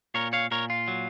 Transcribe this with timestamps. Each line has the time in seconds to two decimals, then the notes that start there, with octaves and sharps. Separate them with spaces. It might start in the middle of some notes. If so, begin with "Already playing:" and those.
0.14 A#2 A#4 C#5
0.33 C#5 F5
0.51 A#2 A#4 C#5
0.70 F4
0.88 F#3